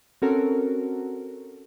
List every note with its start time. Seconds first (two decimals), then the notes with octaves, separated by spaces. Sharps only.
0.22 C4 C#4 F#4 A4 A#4